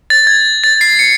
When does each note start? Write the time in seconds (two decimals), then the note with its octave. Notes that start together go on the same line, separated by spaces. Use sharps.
0.10 A6
0.27 G#6
0.64 A6
0.81 C7
0.99 C#7